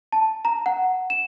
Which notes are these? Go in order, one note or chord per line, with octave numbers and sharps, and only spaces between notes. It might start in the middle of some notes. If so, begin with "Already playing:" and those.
A5
A#5
F#5
E7